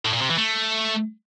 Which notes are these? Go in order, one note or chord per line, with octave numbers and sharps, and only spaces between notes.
A2
A#2
C3
E3
A3